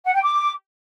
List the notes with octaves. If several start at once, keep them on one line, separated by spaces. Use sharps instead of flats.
F#5
G5
D6